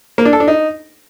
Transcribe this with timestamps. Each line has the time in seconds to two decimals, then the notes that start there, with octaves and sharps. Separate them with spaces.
0.18 A#3
0.25 D4
0.33 A4
0.40 D4
0.48 D#4